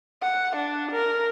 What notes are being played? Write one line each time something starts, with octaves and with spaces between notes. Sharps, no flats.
F#5
D4
A#4